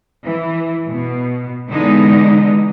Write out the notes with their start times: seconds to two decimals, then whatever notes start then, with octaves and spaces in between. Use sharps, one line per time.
0.25 E3
0.88 B2
1.69 D3 E3 G#3 B3 D#4